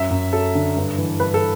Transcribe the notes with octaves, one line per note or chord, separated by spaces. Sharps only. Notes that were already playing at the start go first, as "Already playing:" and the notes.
Already playing: F#2 E5
F#2
F#3 A4
D3
G2
E3
G2 B4
A4